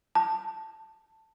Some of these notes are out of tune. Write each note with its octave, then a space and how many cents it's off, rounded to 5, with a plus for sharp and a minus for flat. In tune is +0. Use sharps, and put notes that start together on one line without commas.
A5 +5